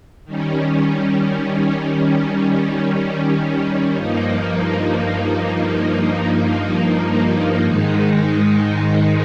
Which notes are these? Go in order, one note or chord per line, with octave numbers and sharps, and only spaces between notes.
D#3 G3 C#4
G2 F3 A#3 D#4
G#2 D#3 G#3 D#4